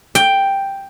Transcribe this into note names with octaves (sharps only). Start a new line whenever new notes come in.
G5